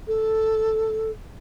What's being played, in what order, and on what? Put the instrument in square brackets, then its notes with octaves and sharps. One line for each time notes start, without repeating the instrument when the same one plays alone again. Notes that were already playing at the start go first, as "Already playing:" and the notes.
[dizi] A4